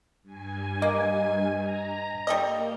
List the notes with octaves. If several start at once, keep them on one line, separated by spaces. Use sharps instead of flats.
G2 G#5
A#3 D#5
A#5
G3 A#3 A4 D#5